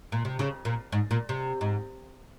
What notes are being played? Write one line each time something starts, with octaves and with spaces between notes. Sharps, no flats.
A#2
C3
C#3
A#2
G#2
A#2
C3
G#2